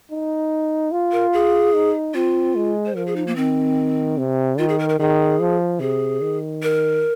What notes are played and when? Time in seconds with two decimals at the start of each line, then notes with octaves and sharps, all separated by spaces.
0.11 D#4
0.92 F4
1.12 A#4
1.33 G#4
1.74 D#4
2.14 C4 F4
2.56 G#3
2.86 C5
2.96 F3 A#4
3.07 G#4
3.16 D#4
3.27 A#3
3.36 D#3 C4
4.18 C3
4.58 D#3 F4
4.69 G#4
4.79 A#4
4.89 A#4
4.99 D#3 G#4
5.41 F3
5.80 C3 G#4
6.21 D#3
6.63 A#4